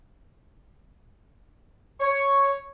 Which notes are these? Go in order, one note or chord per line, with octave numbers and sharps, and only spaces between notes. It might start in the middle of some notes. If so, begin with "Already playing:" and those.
C#5